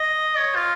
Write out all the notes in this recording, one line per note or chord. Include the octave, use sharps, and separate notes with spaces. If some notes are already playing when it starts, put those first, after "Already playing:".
Already playing: D#5
C#5
F4